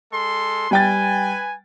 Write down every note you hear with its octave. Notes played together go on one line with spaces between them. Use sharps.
G#3 A4 C6
G3 B4 G5 G#5 A6